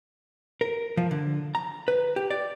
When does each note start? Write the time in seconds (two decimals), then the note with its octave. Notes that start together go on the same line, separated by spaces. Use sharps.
0.61 A#4
0.97 F3
1.11 D3
1.55 A#5
1.88 B4
2.16 G4
2.30 D5